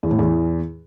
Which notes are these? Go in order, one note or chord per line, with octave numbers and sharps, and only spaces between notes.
E2
A2
E2